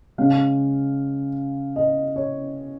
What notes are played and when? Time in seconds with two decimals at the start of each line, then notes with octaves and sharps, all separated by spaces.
0.18 C#3 G#3 C#4 F5
1.76 D#5
2.16 C#5